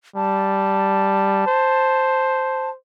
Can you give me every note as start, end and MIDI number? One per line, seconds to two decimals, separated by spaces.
0.16 1.44 55
0.16 2.70 81
1.47 2.76 72